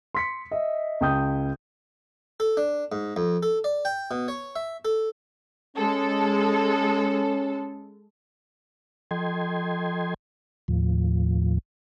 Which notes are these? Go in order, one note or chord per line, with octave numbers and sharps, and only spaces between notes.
C6 B6 C#7
D#5 E5
C#2 G5 D#6 G6
A4
D4
G#2
F2
A4
D5
G5
B2
C#5
E5
A4
G#3 C#4 A4
F3 A4 D#5 G5 C6 G#6
D#2 A2 F3